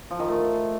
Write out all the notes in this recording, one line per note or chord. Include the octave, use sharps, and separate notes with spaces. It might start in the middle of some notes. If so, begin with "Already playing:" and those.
F3
D#3
A3